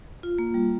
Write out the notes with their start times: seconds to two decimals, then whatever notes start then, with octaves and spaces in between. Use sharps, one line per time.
0.23 F4
0.38 A#3
0.54 G3